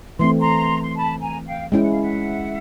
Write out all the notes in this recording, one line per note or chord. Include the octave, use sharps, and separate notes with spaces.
E3 A3 C4 C6
A#5 C6
C6
A5 B5
G#5 A#5
F5 G5
G#3 C#4 E4 G5
F#5
F5
E5 F#5